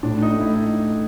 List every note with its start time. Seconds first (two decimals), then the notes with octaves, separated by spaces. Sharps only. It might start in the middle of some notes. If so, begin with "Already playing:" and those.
0.03 A2 D4
0.22 D#4
0.31 A3
0.41 E4